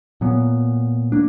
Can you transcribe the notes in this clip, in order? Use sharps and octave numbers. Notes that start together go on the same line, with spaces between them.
A#2 F#3 B3
A#3 D4